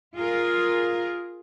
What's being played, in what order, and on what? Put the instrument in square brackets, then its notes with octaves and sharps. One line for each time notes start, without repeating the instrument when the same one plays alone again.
[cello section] F4 G#4 A#4